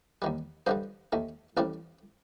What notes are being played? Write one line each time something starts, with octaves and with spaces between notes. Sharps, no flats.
D#2 D#3 G3
G2 D3 G3 C5 D#5
D#2 D#3 A3
A1 A2 G3 C4 A#4 D5